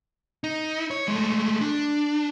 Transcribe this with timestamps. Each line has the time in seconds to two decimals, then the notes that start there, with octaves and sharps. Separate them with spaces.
0.44 D#4
0.91 C#5
1.08 G#3 A3
1.61 D4